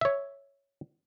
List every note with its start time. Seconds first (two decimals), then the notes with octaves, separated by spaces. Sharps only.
0.01 C#5 E5